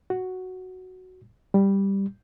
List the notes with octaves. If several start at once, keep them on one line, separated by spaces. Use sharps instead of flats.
F#4
G3